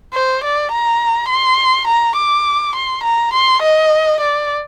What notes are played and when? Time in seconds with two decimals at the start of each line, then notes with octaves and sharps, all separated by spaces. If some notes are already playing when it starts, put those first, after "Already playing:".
0.13 C5
0.43 D5
0.71 A#5
1.29 C6
1.87 A#5
2.17 D6
2.75 C6
3.04 A#5
3.33 C6
3.62 D#5
4.20 D5